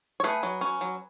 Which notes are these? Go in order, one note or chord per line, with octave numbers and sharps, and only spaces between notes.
C#5
A3 G#4 B4
F#3
C#4
F#3